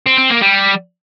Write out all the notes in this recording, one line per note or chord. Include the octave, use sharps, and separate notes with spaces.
C4
C4
A#3
G3